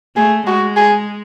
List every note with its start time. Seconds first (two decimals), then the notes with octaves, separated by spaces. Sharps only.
0.16 A3 G#4
0.47 G#3 F#4
0.76 G#4